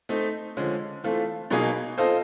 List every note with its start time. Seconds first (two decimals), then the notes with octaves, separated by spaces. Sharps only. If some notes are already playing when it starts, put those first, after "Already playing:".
0.09 A3 C4 D#4
0.57 D3 F3 G#3 C#4
1.04 E3 A3 C4 F4 A4
1.50 B2 F#3 A#3 D#4 G#4
1.98 C4 F4 A4 C5 D#5